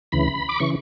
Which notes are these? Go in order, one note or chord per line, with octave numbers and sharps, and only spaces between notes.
D2 C#3 E3 B5
D6
C#3 E3 C#6